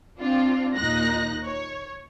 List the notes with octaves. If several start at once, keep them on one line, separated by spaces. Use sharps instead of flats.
C4 D4 F4
D#2 A#2 D#4 F#6 A#6
C#5